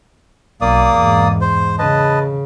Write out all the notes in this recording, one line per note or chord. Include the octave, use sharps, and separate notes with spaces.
B1 A#3 D5 D#6
E2 G#2
C5
C#3 B4 D#5 A5